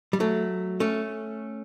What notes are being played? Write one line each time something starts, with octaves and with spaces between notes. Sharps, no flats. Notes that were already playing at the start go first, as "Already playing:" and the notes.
G3
F#3 A3
A3 C#4